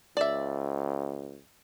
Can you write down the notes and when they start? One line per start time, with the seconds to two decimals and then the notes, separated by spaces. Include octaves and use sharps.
0.17 C#2 D5 E5